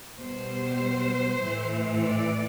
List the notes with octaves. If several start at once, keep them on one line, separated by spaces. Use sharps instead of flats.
B2 G3 C5
A2 E3 A3
D5